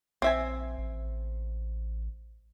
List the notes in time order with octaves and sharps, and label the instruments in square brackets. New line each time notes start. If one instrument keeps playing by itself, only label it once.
[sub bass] A#1 [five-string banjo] C4 E5 G#5
[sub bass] A1